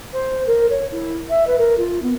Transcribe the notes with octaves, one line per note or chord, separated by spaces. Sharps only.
C5
A#4
C#5
E4
E5
B4
A#4
F4
B3